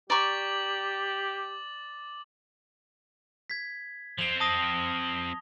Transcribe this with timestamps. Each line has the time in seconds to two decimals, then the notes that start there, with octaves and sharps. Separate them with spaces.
0.10 G4 D5 A#5 C#6 D6 A6 F#7
3.50 G#6 B6
4.18 F3 C4 F7 G7
4.40 A5 D#6 A#6